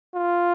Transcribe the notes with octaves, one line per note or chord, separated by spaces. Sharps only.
F4